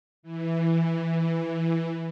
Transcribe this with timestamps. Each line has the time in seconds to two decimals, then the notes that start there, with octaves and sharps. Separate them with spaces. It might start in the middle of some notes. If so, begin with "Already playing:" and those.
0.23 E3